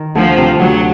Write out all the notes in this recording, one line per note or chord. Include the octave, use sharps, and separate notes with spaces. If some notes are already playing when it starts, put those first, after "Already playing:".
Already playing: D#3
D2 F3
C3
D2 F#3